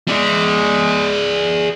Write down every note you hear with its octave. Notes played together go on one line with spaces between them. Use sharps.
G#3 G#4 D5